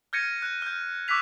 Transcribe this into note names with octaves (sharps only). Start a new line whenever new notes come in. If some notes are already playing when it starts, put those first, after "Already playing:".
F6 G6 G#6 A#6 C#7 D#7
F#6 D#7
F6 G6
C#6 D6 E6 F#6 B6 F7